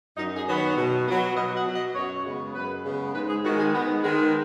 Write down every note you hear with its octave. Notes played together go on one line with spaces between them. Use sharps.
F#2 D#4
G#4
D#3 F#3 B3
C#5
B2
F#3 B3
B2 D#5
F#5
F#3 B3
D#5
F#2 C#5
C#3 G#3 B3
F#2 B4
C#3 G#3 B3
G#2 B4
G#4
D#3 G#3 F#4
G#4
G#2 B3
D#3 G#3